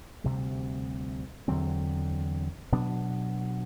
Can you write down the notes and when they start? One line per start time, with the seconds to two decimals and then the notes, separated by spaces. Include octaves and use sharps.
0.24 D2 C3 G3
1.48 E2 D3 F#3 C4
2.72 B2 F#3 B3 D4